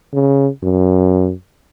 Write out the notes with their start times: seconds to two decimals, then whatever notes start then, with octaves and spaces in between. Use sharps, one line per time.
0.13 C#3
0.63 F#2